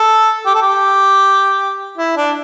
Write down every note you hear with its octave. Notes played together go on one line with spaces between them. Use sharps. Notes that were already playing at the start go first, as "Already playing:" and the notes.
Already playing: A4
G4
A4
G4
E4
D4